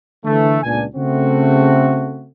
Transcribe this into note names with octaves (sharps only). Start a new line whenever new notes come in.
D3 E3 A3
C#2 A#2 B3 D4 G#5
C#3 A3 C4 F#4